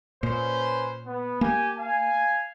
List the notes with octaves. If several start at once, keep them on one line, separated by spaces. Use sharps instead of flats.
A#2 C#4 B4 C5
B3
A#3 G4 G#5
F5 G#5